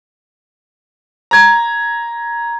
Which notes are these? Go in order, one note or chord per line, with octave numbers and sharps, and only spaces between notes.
A#5 G#6